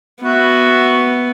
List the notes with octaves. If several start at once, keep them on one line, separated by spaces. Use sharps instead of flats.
B3 F#4 E5